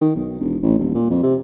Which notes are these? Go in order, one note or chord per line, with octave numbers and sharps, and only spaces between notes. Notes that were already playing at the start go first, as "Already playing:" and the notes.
D#3
B1
E1
A1
D#1
A#2
F2
C3